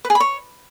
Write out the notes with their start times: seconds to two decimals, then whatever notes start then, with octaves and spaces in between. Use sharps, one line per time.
0.05 B4
0.10 G#4
0.15 B5
0.20 C#5